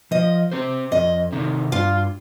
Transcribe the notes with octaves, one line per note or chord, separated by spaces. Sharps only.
F3 D#5
C4 G4 C5
F2 D#5
C3 D#3
G2 F4